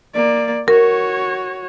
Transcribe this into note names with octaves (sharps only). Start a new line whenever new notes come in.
A#3 D5
F#4 A#4 C#5